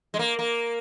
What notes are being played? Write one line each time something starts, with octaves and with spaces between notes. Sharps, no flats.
G#3
A#3
A#3